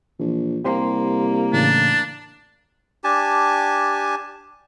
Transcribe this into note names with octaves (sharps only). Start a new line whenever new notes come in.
A#1 E3
C2 A#3 G4 C5 C6
A2 C#3 E3 D4
D4 G4 G#5 A5